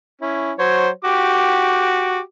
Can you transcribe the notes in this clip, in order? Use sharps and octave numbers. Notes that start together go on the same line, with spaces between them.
C#4 E4
F#3 C5 C#5
F#4 G4 D6